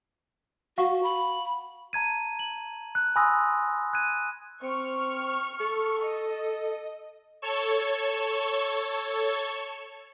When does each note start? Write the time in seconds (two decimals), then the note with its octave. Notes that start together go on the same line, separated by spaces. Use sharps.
0.78 F#4 F5 F#5 C#6
1.03 B5
1.93 A5 A#5 G#6 D#7
2.39 F#7
2.95 F#6
3.16 G#5 B5 C6 D#6 E6 A#6
3.93 F#6 G#6 D#7
4.63 C4 C#6 F6
5.60 A4
6.04 D#5
7.42 A4 C#5 C#6 E7